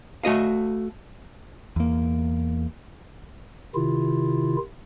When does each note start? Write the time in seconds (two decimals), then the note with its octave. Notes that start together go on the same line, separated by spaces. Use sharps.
0.24 A3 F#4 D#5 F5
1.76 E2 A#3
3.75 C3 D#3 E4 F4